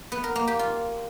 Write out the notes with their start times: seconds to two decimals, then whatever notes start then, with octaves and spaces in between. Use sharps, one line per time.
0.12 B3
0.24 A#4
0.36 A#3
0.47 G4
0.59 F4